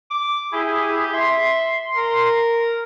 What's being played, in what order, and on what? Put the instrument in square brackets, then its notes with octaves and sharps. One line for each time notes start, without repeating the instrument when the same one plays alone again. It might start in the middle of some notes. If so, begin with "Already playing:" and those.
[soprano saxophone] D6
[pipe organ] E4 G#4 [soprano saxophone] G4
[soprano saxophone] E5 [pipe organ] C6
[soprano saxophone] A#4